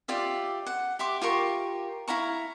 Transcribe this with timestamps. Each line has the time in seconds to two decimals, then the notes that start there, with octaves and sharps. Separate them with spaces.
0.08 F4 G4 D5 E5
0.66 F#5
0.99 G4 E5 C6 D6
1.22 F4 G4 A#4 C#6
2.08 E4 F5 A#5 C#6